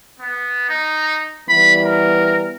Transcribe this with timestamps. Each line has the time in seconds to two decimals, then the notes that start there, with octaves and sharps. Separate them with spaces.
0.20 B3
0.69 D#4
1.49 E3 G3 B3 B5
1.84 A#4